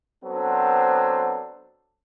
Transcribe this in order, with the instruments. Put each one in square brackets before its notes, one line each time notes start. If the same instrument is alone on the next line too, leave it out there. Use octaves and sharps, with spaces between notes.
[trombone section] F#3 B3 C4 D4 A4 C5